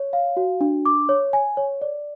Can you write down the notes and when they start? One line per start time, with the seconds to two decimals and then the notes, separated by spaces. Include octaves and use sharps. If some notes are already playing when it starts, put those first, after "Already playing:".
Already playing: C#5
0.13 F5
0.37 F#4
0.61 D4
0.86 D6
1.09 C#5
1.33 G#5
1.57 C#5
1.81 D5